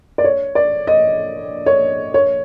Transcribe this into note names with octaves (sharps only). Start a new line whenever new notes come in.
D5
C#5
D5
D#5
C#5
C#5